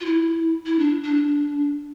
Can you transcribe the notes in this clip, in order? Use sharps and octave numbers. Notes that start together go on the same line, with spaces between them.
F4
E4
E4
D4
D4